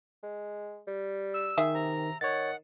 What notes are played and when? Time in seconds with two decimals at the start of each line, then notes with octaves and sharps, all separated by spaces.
0.23 G#3
0.87 G3
1.34 E6
1.58 D#3 G#4 E5
1.74 C3 A#5
2.21 D#3 C#5 F#5 A6